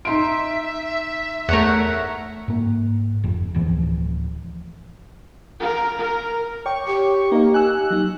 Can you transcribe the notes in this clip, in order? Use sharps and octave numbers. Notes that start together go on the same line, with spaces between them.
D#4 E5 C6 D7
E2 A3 A#4 C#5 F#5
G#2 A#3
F1 F2
D1 E3 F3
A#4
A#4
C#5 G5 C#6 D6
G4
A#3 D#4 D#5
G#5 E6 F#6
F#3 D#4